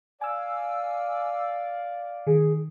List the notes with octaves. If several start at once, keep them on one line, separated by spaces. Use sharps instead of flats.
D5 F5 G#5 E6
D#3 G#4